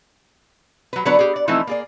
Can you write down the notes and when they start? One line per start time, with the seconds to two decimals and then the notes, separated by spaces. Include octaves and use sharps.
0.93 F#3 B4
1.05 D3 F#3 B3 D4 B4 D5
1.19 G4 G#4
1.36 D5
1.48 E3 F3 A3 C4 D#4 E4
1.67 A#3 G#4 D5